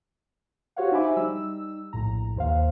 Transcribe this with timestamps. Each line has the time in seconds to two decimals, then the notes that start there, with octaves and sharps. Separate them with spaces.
0.76 F#4 G4 C5 C#5 F5 F#5
0.92 D#4 C5 E5 G#5 B5 D6
1.16 G3 D#4 E6
1.93 A#1 A2 A#5
2.36 D#2 C5 F5